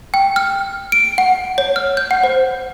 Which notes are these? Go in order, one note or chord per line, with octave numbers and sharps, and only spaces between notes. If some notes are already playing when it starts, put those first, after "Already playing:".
G5
F6
D7
F#5
C#5
F6
G6
F#5
C5